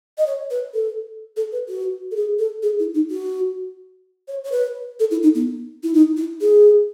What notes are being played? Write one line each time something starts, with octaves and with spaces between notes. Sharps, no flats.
D#5
C#5
B4
A4
A4
B4
F#4
A4
G#4
A4
G#4
E4
D#4
F#4
C#5
C#5
B4
A4
E4
D#4
B3
E4
D#4
E4
G#4